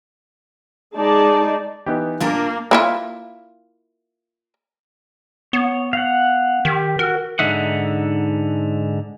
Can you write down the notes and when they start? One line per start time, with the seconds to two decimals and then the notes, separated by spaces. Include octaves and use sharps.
0.96 G#3 D#4 G#4 D5 A5
1.87 E3 B3 D#4 G4
2.20 A#2 A#3 D4 F4 A#4
2.71 A#3 E4 F4
5.53 B3 C#5
5.93 F5 F#5
6.65 D#3 G4
6.99 F#4 A#4
7.39 G#2 D3 D#4 E5 F#5